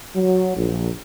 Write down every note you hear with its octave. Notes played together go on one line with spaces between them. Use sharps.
F#3
A#1